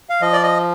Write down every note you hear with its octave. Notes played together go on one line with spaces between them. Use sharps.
F5
F3 D#5
D5
D#5